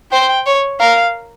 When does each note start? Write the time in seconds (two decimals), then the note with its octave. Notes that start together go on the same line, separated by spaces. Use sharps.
0.12 C5 G5
0.46 C#5
0.80 A#4 F5